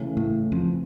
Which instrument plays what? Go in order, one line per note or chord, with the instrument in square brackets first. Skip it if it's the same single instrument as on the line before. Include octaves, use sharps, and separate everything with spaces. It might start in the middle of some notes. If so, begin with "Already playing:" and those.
Already playing: [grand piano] C#3 E3 A3
[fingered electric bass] A2
F2